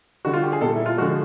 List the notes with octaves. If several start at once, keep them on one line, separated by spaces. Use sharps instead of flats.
D3 G3 F#4
F4
G4
G#4
A#2 G3 A4
E4
F4
D3 F3 G#3 F#4